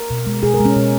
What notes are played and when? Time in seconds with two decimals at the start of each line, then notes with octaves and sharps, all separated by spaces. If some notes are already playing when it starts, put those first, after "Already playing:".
Already playing: A#4
0.10 B2
0.27 G#3
0.43 B2 G#4
0.54 A#4
0.60 G#3
0.65 C#4
0.76 B2